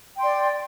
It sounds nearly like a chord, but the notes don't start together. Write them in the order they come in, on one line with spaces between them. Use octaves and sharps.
G5 C6 D5